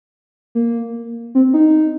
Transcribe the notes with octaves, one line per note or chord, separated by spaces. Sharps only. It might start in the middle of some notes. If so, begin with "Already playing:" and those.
A#3
C4
D#4